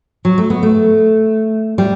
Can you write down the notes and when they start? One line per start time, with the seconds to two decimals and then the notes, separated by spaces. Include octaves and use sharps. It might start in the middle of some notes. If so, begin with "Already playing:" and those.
0.25 F#3
0.38 A3
0.50 B3
0.63 A3
1.78 G3